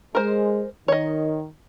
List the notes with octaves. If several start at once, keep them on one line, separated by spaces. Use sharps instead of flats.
G#3 A#4 C5
D#3 C#5 D#5